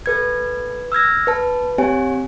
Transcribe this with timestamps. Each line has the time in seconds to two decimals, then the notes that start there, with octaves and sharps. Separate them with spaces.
0.06 A4 B4 G#6
0.92 E6 F6 G#6 A#6
1.27 B4 A5
1.78 C4 G4 C#5 G#5